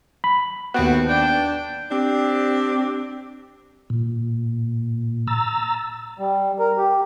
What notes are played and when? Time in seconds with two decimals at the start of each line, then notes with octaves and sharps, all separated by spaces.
0.24 B5
0.74 D#2 A3 B3 C4 F#4
1.08 D4 G5
1.92 C4 D4 G4
3.90 A#2
5.27 A#5 E6 A6
6.19 G3
6.59 A#4
6.78 G4